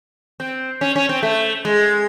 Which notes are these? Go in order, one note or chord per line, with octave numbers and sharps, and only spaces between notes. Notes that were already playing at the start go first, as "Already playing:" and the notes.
C4
C#4
C#4
C4
A3
G#3